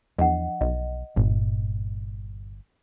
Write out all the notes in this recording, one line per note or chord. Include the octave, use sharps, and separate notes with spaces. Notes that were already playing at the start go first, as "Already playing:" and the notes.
E2 F3 D4 D#5 F#5
B1 D#5
G1 G2 A#2